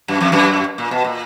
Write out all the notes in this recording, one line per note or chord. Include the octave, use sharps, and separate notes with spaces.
F#2
F2
F#2
A#2
B2
A#2